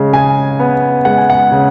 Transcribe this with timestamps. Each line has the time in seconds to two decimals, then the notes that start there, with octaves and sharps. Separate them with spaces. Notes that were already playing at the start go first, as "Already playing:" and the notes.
Already playing: C#3 G#3
0.13 C#3 G#5
0.59 B3
1.05 G#3 F#5
1.18 G#5
1.30 F#5
1.51 C#3